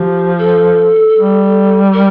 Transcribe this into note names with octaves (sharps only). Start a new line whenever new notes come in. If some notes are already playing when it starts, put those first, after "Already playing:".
Already playing: F3 G4
A4
G3
A#4